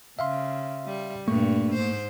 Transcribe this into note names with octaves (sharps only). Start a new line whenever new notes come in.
C#3 E5 F5 C6
G3
G2 A#2 A3 A#3 C#6
G#2 C5